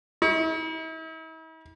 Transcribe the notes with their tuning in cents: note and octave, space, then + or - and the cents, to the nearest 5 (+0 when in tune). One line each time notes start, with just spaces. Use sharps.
E4 -45